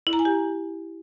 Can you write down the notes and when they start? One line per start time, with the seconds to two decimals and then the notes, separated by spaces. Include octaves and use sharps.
0.07 E4
0.13 A#5
0.19 G#5
0.25 G4